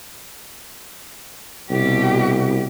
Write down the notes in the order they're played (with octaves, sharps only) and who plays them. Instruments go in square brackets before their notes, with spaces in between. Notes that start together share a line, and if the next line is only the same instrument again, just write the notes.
[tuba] C2 [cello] B2 G4